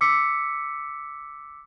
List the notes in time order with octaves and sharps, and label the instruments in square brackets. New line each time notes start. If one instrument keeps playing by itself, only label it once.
[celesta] D6 E6 B6 C#7